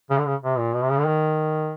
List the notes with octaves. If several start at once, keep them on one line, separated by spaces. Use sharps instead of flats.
C#3
D3
C#3
C3
A#2
B2
C3
C#3
D3
D#3